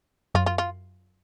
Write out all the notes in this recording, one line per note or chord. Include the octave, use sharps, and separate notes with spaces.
F#2 F4
F4
F4